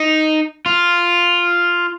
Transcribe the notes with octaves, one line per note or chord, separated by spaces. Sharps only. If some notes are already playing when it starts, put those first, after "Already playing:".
Already playing: D#4
F4